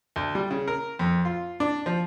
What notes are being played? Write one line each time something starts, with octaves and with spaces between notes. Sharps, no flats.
D2
G3
C#3
A#4
F2
F4
D4
F3